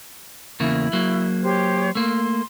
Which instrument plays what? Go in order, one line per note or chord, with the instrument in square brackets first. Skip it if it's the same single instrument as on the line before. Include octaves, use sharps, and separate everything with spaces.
[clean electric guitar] E2 C#3 A#3 [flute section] E4
[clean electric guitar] F#3 A#3
[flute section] G4 C5 C#5
[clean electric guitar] A3 A#3 [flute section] C6